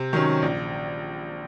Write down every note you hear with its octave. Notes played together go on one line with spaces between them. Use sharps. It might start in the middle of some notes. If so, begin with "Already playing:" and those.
Already playing: C3
D#3 F#3 C#4
A#1